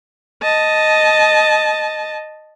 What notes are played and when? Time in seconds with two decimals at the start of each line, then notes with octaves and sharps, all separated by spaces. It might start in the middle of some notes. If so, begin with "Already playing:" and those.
0.43 D#5 A5